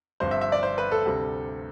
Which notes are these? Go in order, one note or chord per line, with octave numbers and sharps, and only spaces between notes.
G1 G2 F3 C4 C5
E5
E5
D5
C5
B4
A4
D2 C3 G3